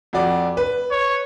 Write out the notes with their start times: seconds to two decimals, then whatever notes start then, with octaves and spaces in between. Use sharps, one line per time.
0.13 F2 F#4 D5
0.57 B4
0.91 C#5